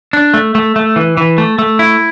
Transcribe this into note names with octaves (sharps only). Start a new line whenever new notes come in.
D4
A3
A3
A3
E3
E3
A3
A3
E4